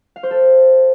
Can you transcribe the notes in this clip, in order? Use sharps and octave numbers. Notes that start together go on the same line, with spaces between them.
F5
C5
A4